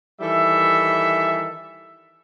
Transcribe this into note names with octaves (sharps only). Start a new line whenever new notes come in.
D#3 E3 G3 A4 E5